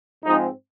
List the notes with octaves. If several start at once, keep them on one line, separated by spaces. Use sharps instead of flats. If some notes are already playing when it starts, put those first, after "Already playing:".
G#2 F3 G#3 C4 D#4